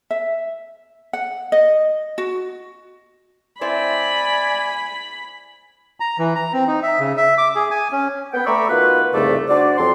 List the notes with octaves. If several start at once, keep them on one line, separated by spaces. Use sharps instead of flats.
E5
F#5
D#5
F#4
C4 E4 C5 D5 G#5 B5
A#5
E3
A#5
C4
D#4
E5
C#3
E5
D6
G#4
G#5
C#4
B3 G5
A3 D5 A#5 B5 C#6 E6
D#3 B3 F4 F#4 B4
C2 F2 G#2 C#3 A3 D5
D4 F#4 C5 D5
F2 F#3 C4 C6